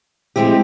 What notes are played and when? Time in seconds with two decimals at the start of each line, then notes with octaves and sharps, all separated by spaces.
0.36 F3 G#3 C4 E4 G4